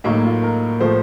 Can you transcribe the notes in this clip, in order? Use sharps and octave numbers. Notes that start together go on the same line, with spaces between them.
A2 F#3 A#3 D#4
F4
A#4
A2 F3 A3 C5